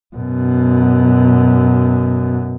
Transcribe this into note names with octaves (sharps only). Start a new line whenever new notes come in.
F#2 B2